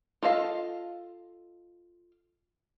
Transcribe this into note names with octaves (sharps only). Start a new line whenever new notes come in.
F4 A4 D#5 F5